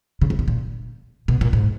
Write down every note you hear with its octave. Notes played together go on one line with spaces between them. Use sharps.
C#3
C3
B2
A#2
B2
A#2
G#2